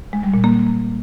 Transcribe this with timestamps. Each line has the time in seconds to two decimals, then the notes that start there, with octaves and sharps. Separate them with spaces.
0.13 G#3
0.23 G3
0.34 A#2
0.44 A#3